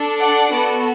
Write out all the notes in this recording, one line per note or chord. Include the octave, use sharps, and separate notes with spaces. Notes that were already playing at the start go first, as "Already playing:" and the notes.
Already playing: D4 A4
D5 F#5
B3 F#4 A4